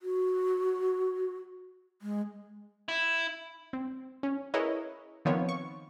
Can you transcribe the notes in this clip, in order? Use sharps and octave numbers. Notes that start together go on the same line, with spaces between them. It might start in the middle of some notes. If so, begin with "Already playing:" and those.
F#4
G#3
E4
C4
C#4
E4 G#4 A#4 B4 C#5 D#5
D#3 F3 B3 C4 F4 C#5
C#6